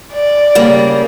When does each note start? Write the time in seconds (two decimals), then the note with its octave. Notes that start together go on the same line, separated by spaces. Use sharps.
0.13 D5
0.55 C#3 G3 A#3